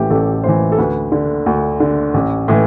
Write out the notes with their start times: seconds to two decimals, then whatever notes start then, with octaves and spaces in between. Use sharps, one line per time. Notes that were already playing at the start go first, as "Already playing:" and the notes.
Already playing: A1 A2 E3 G4
0.10 A1 A4
0.44 A2 E3 C5
0.72 A4
0.78 D2 B4
1.12 D3
1.46 D2
1.80 D3
2.14 A1
2.48 A2 E3